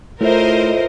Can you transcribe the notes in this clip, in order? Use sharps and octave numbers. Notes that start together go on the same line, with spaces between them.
A2 A3 E4 F4 A#4 C5 D#5 E5